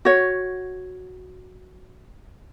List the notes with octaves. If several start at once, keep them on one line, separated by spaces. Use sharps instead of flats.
F#4 C#5